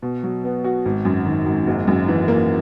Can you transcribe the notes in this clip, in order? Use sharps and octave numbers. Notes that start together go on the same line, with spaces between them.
B2
F#3
B3
F#4
G#1
F#2
D#3
G#1
F#1
F#2
E3
A#3